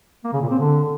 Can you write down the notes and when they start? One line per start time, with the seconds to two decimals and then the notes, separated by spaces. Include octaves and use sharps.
0.24 A#3
0.33 C#3
0.42 A#2
0.50 C4
0.59 D3